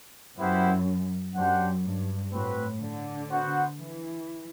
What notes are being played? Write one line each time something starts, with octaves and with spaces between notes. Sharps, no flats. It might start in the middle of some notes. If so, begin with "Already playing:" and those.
F#2 B3 E4 G4 C5 F#5
F#2 D4 G4 C5 F#5
G2
A2 C4 F#4 B4
D3
B3 F#4 C5 F#5
E3